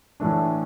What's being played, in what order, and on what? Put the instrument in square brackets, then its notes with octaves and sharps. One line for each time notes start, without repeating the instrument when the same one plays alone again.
[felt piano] A2 E3 A3 D4